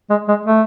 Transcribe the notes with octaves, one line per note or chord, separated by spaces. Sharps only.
G#3
G#3
A3